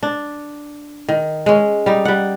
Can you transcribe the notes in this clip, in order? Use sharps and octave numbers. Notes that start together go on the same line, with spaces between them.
D4
D#3
G#3 C#4
G3 D#4
G3 F#5